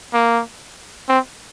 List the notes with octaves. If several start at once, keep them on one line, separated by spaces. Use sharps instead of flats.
A#3
C4